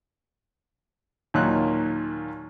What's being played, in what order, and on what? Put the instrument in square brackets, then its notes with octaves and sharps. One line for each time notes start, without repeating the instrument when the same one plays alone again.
[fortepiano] D#2 A#2 F#3 D#4 F4 F#6